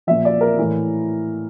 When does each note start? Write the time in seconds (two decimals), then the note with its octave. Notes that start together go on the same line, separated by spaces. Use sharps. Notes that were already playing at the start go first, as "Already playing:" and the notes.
0.07 A#2 F3 E5
0.25 D5
0.41 A#4
0.58 A2 E3